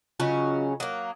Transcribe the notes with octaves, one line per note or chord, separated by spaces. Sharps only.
C#3 F#3 C#4 F4 D#5
F#3 A#3 D#6